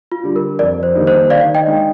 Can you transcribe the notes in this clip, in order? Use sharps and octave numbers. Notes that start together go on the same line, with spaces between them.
F4
D3 G3
A#4
F2 A#4 D5
C5
D#3 G3 A#3 D#4
C5
D#3 D5 F5
D#5 G5
G#3 D#4